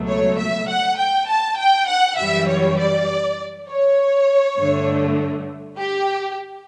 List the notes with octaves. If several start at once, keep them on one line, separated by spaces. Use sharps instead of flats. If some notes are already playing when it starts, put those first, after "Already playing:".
Already playing: C#2 B2 F#3 A3
C#5
E5
F#5
G5
A5
G5
F#5
F#2 E3 G3 E5
C#5
D5
C#5
G2 D3 A3
G4